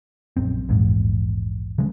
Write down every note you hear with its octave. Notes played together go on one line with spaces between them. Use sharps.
A#1 F#2 C4
A#1 E2 G#2
C#3 F#3 G#3